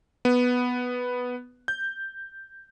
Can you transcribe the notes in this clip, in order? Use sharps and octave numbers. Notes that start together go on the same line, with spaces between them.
B3
G6